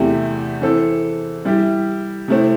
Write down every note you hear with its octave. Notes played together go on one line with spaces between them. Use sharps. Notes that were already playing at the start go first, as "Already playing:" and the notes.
Already playing: E2 C3 A3 E4 G4
E3 C4 A4
G3 E4 G4
C3 A3 C4 E4